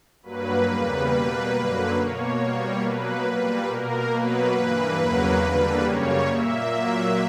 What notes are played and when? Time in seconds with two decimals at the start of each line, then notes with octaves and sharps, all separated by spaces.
0.23 G2 F#3 A#3 B4
0.66 E2 C#3 G3 A#3 B4
1.09 B2 G3 A#3 B4
1.53 F#2 D3 F#3 A#3
1.95 B2 A#3 C#5
2.38 B2 G3 A#3
2.82 B2 F#3 A#3 B4
3.26 A#2 G3 A#3
3.68 B2 A#3 A#4
4.11 B2 F#3 A#3 B4
4.54 G2 E3 A#3 B4
4.98 E2 C#3 F#3 A#3 B4
5.41 E2 D3 G3 A#3
5.84 F#2 C#3 G3 A#3 C#5
6.27 A#2 A#3 E5
6.70 A#2 F#3 A#3 E5